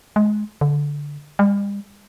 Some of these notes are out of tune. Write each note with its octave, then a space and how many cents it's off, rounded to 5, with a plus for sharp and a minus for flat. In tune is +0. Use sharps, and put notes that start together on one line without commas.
G#3 +20
D3 -10
G3 +45